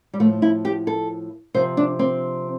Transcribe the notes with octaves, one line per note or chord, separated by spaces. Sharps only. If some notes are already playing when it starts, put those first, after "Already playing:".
G3
A2 F3 A3
E4
G4
A4
C3 F3 C5
D4
C4